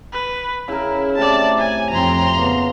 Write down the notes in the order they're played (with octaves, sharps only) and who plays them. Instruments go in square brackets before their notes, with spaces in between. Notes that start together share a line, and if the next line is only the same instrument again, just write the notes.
[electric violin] B4
[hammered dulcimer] C#3 A#4 [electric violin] E4
[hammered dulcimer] A2 C3 E4 [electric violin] D5 A5
[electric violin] G#5
[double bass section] F2 C4 [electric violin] A#5 C6
[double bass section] C#3 B3 [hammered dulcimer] A#3